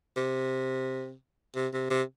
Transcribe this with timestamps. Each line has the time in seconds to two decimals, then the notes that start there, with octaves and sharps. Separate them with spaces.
0.16 C3
1.55 C3
1.73 C3
1.90 C3